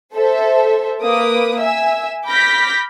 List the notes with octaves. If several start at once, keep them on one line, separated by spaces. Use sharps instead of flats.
A4 C5 E5
A#3 B4 D6 D#6
E5 G#5 E6
B5 D6 F6 G6 A#6 B6